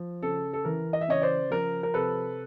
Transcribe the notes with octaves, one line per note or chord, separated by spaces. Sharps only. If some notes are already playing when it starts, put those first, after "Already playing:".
Already playing: F3
C#3 A4
A4
E3 A#4
D#5
E5
C#3 C#5 D#5
C5 D5
F3 A#4
A#4
C3 A4 B4